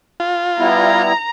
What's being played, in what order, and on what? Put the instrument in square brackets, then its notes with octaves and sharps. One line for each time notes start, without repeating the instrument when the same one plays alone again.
[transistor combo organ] F4
[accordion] G3 B3 E4 [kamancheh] A#5